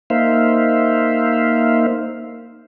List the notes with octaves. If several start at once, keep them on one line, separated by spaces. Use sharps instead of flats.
A#3 D#4 C5 E5 F5